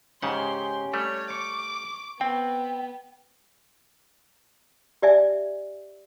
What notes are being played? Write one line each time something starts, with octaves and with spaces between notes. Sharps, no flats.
G#2 C#3 C#4 G4 F#5 C6
G3 A3 C#5
C#6 D6
B3 C4 G5
G4 D5 E5 G#5